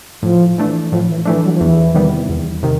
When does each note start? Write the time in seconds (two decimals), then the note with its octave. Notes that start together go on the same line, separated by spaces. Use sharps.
0.23 A2 F3
0.58 E3 A3 D4
0.91 A2 F3
1.09 E3
1.25 E3 F3 A3 D4
1.44 F#3
1.54 F3
1.61 E2 E3
1.94 C3 D#3 G3 B3
2.29 E2
2.63 C3 D#3